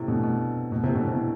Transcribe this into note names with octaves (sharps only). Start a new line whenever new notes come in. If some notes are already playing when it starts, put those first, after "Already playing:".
Already playing: A2 C3
B2 D3
B2
B2
A2 C3
B2 D3
A2 C3
A2